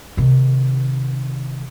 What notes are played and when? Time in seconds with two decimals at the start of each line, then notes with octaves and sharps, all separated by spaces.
0.17 C3 D#3